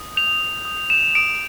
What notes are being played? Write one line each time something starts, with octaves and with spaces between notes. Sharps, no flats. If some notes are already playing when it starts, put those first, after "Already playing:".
Already playing: D#6
G6 F7
D#6
D#6
G6 E7
D#6 D7